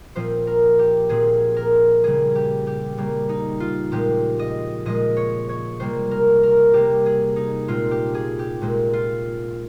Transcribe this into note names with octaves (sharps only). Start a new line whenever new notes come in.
A#2 F3 C4 C5
A#4
G4
A#2 F3 C4 G#4
A#4
C#3 G3 A#3 G#4
G4
G4
C#3 G3 A#3
D#4
F4
A#2 F3 G#3 G4
D#5
A#2 F3 G#3 D#5
C#5
C#5
C3 G3 A#3 C5
A#4
A#4
C3 G3 A#3 G4
G#4
D#4
A#2 G#3 C4 F4
G4
G#4
G4
A#2 G#3 C4
F4